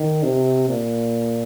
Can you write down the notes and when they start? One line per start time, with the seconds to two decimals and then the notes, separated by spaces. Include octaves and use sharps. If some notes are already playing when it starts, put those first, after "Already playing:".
Already playing: D#3
0.23 C3
0.69 A#2